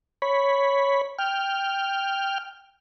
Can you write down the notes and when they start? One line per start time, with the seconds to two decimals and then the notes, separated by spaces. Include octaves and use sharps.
0.22 C#5 B5
1.18 G5 F6